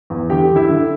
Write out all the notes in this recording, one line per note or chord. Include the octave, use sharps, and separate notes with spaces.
E2
D3 G4 G5
D3
E4 E5
D3